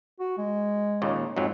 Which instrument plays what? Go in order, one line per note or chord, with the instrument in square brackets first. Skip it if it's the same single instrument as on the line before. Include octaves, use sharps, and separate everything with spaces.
[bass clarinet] F#4
G#3
[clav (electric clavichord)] D#2 A#2 C#3
[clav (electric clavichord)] F2 G#2 F#3 [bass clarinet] G#3